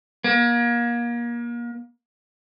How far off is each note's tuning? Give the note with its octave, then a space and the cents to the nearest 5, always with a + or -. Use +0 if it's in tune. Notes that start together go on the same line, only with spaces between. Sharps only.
A#3 +30